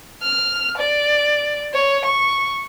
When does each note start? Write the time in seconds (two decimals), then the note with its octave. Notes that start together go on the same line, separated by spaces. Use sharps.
0.22 F6
0.78 D5
1.74 C#5
2.05 C#6